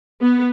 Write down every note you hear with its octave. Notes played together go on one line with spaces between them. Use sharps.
B3